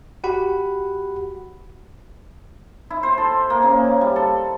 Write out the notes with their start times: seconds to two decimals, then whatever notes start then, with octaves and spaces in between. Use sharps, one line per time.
0.24 F#4 G4 F#5 B5
2.90 E4
3.03 C5
3.18 A4
3.50 A#3
3.63 C#3
3.84 D6
4.01 G3
4.16 A4